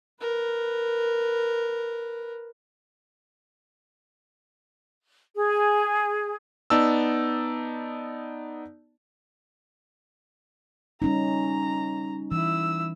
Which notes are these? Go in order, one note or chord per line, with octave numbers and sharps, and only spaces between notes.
A#4 B4
G#4
B3 D#4 D5 A5 E6
G3 C#4 D#4 A#5
E3 E4 E6